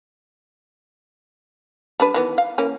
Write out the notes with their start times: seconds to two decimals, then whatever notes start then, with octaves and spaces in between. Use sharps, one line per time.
2.00 G3 D4 B4
2.14 D#3 E3 B3
2.38 F5
2.58 E3 A#3 C#4